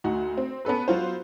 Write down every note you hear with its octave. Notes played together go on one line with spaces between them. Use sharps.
D2 D#4 F#4
C4
B3 C#4 A4 B4
F#3 B3 F4 F#4 C5